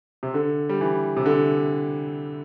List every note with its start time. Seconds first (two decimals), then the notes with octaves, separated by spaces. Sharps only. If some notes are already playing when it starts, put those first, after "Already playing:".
0.23 C3
0.34 D3
0.69 G3
0.81 E3
1.17 C3
1.26 D3